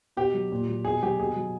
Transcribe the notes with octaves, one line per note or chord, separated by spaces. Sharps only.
B2 G4
F#3
A#2
F#3
B2 G#4
F#3 G4
B2 G#4
F#3